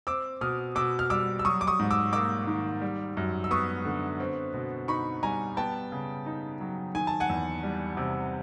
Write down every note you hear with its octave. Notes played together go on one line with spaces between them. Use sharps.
C4 D6 E6
B2 D#6 F6
B2 D6 E6
F6
G3 D6 E6
E6
F#3 C#6 D#6
D6
C#6 D#6
G#2
D6 E6
A#3 D6 E6
D#3
G3
F#2
E6
B3 C#6 D#6
D3
C4
B2
D#4 B5 C#6
G3 G#5 A#5
B3 G5 A5
C#3
D#4
F#3
D#3 G#5
A5
F#5 G#5
E2
G3
C3